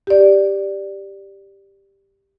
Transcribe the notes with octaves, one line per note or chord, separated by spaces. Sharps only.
G4 D5